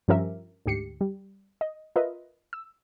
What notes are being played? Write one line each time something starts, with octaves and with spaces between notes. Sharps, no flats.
G2 F3 C#4 G4 A#4 E5
D2 G#2 G4 C7 C#7
G3
D#5
F4 A#4 B4 D#5 E5
E6